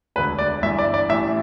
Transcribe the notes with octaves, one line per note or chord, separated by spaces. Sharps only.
E1 D2 D3 B4
D5
G1 G2 E3 E5
D5
D5
A1 A2 E3 E5